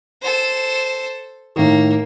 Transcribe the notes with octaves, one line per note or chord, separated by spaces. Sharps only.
A4 C5
A2 D#3 A#3